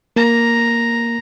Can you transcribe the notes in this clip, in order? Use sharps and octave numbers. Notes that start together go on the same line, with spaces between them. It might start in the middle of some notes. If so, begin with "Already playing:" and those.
A#3 A#5